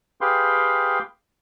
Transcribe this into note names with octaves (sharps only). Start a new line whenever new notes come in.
G4 G#4 B4 F5 G5 C6